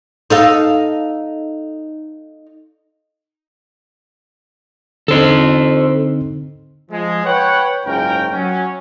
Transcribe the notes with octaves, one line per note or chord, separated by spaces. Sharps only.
D#4 A4 F5
D3 C4 D#4 A4 C5
F3 G#3
B4 C#5 F#5 G5
F#1 G#2 C#4 F4 A#4 G5
F#3 C#4